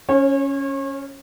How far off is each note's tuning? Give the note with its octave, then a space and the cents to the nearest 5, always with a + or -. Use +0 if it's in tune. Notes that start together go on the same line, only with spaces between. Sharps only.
C#4 +0 C#5 -35